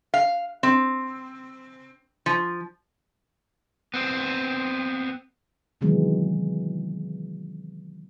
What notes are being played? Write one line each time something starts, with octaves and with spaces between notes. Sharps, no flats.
F5
C4
F3
B3 C4
C3 D#3 E3 F#3 G#3 B3